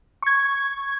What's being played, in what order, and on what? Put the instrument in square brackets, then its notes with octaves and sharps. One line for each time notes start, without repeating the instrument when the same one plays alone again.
[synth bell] C#6 G#6